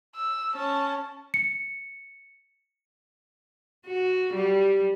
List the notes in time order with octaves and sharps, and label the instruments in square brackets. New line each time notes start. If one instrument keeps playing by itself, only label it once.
[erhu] E6
[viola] C#4 [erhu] A5
[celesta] C#7
[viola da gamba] F#4
G3